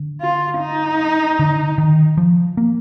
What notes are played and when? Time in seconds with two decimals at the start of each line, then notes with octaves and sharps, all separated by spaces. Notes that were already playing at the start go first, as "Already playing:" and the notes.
Already playing: D3
0.21 F4
0.60 D#4
1.39 D3
1.78 D#3
2.17 F3
2.57 A#3